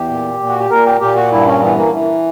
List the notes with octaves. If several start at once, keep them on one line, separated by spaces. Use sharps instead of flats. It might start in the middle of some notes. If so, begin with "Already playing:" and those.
Already playing: E2 G4
A#2
A#2
F#4
G4
A#2 A#4
G4
A#2 G4
F#4
G2 E4
C#4
E3 B3
A#3
E3